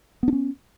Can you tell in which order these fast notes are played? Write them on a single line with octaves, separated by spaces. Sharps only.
B3 D4 C#4